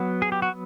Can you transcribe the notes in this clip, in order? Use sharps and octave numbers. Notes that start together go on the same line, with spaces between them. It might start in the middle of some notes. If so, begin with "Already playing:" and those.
Already playing: F#3 B3
G#4
G4
F#4